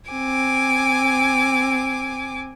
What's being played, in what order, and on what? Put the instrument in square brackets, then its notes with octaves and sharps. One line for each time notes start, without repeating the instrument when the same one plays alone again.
[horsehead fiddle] C4 [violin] G#5 D6